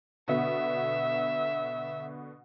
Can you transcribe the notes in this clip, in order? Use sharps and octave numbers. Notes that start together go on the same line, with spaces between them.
B2 D3 B3 E5